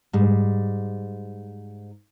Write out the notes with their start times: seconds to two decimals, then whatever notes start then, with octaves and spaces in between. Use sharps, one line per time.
0.13 G#2 G3